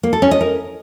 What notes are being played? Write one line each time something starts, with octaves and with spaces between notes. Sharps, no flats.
A#3
A4
C#4
D#5
A#4